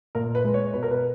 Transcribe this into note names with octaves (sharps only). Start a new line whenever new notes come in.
A#2 A#4
B4
G#3
C#5
B2 B4
A#4
B4